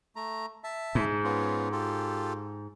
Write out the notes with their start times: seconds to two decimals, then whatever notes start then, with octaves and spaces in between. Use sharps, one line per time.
0.16 A3 A#5
0.64 E5 A5
0.95 G#2
1.24 B3 C#4 F4
1.72 F4 G4 A4